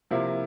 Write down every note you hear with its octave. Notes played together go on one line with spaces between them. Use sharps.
C3 F3 A#3 E4